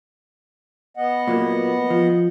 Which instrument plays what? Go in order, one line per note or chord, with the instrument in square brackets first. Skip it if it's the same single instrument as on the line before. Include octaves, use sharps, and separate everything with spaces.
[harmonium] B3 D#5 F#5
[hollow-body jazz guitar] A#2 F#3 A#3
F3